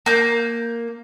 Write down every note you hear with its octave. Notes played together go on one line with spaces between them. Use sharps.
A#3 G6